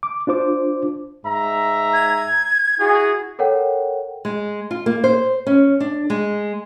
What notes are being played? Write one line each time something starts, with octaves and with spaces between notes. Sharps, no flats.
D6
D4 F4 C5 D6
G#2 E5 A#5
G#6
E4 F#4 G#4
A4 A#4 C#5 F#5 G5
G#3
F4
A#3
C5
C#4
D4
G#3